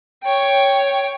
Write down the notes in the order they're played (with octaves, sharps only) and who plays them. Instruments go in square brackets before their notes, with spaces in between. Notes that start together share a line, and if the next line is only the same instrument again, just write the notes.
[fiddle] C#5 G5